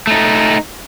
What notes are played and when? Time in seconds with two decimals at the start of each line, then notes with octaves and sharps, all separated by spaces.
0.07 A3 D#4